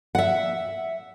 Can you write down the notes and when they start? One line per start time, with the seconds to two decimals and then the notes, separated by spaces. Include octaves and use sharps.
0.15 E5 F#5